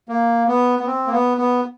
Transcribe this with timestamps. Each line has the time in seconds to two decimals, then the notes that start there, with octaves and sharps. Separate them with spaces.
0.09 A#3
0.48 B3
0.79 B3
0.87 C4
1.06 A#3
1.12 B3
1.37 B3